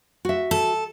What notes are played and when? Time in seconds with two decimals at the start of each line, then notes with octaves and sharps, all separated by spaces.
0.25 F#4 E5
0.51 A4